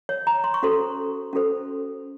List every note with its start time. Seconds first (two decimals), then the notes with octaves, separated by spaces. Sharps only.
0.09 C#5
0.27 A#5
0.44 C6
0.54 C#6
0.63 C#4 F#4 A4 C5 C6
1.33 C#4 F#4 A4 C5